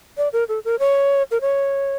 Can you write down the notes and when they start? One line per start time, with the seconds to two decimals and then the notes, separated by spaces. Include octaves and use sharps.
0.18 D5
0.33 A#4
0.49 A4
0.65 A#4
0.79 C#5
1.31 A#4
1.41 C#5